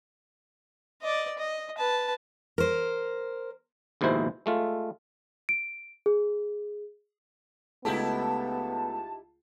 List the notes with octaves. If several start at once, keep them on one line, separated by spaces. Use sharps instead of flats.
D5 D#5
D#5
B4 A5
A#4 C5
A#1 D#2 G#2 B2 E4 C5
G#3 A3 F4
D7
G#4
C#2 A3 B3 D#4 E4 G4 A5